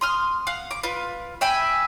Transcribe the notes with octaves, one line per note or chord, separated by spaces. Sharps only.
C6 D#6 F6
F5 F#5
D6
F4 B4
E5 G5 G#5 B5